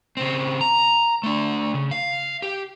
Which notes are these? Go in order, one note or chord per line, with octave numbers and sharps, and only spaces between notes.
C#3 C4
A#5
A3 D4
C#3
F5
G4